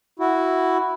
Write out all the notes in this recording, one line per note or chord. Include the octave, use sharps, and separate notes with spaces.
E4 F#4